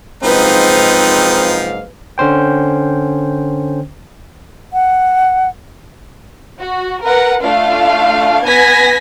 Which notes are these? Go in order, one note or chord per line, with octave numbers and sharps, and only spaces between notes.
F#1 G#2 F3 C4 D#4 B4 F5
D3 C#4 C5 G5
F#5
F#4
A#4 B4 F#5
A3 D4 F4 F5
B3 G#5 G#6 A#6 B6